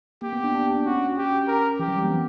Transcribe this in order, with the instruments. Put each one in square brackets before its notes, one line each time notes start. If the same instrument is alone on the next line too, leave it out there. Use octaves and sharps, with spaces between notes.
[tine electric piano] A#3 [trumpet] G4
[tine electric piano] B3
D4
D4
D4
[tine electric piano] C#4 [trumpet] F#4
[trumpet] G4
A#4
[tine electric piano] E3 [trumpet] G4
[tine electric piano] F#3
G3
A#3
B3